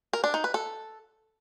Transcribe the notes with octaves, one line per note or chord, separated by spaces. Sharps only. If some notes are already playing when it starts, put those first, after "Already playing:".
A#4
D4
D#4
B4
A4